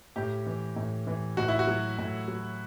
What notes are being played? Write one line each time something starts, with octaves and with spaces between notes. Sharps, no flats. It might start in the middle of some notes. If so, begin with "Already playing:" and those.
A2 G4
E3
A2
E3
A2 F#4
E4
F#4
F#3
A2
F#3